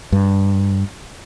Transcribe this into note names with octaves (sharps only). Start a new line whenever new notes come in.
G2